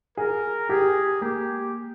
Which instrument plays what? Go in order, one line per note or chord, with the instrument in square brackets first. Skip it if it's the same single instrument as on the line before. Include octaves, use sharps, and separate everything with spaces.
[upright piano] G#4 [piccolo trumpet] A#4
[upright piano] G4 [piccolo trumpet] G#4
[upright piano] A#3 [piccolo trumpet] G4